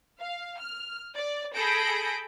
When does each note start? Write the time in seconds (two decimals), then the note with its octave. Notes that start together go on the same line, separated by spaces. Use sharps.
0.20 F5
0.60 F6
1.15 D5
1.55 G#4 A4 B5 G6 A#6 D7